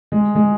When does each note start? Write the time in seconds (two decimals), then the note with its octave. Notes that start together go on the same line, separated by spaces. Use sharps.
0.12 G#3
0.35 G#3